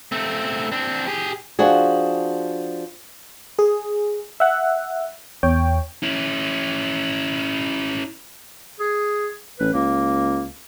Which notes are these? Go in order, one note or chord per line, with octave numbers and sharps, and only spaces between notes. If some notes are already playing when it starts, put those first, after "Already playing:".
A3 C4
C4 D4
G4 G#4
F3 D4 F#4 G#4
G#4
E5 F#5
E2 C#5 G5
C#4 E4
G#4
A1 B4
C#2 A#3